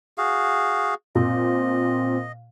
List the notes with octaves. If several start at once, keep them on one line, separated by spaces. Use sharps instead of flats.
F#4 G#4 F5
A#2 C4 D#5